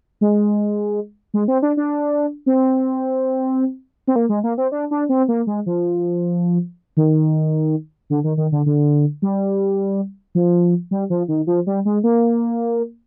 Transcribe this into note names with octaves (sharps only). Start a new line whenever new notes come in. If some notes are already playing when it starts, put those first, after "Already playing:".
G#3
G#3
C4
D4
D4
C4
C4
A#3
G#3
A#3
C4
D4
D4
C4
A#3
G#3
F3
D#3
D3
D#3
D#3
D3
D3
G3
F3
G3
F3
D#3
F3
G3
G#3
A#3